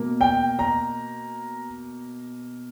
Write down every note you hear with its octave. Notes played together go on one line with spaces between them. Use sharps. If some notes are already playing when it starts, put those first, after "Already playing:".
Already playing: B2 A#3
G5
A#5